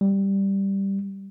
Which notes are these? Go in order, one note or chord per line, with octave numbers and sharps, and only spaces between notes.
G3